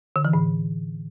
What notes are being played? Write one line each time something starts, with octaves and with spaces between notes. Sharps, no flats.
D3
E3
A2